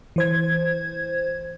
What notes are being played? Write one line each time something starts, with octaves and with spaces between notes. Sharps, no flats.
E3 C5 G#6